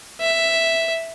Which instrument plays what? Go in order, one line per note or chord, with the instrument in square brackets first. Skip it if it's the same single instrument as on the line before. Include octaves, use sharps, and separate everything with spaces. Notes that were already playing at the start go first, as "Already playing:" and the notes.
[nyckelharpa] E5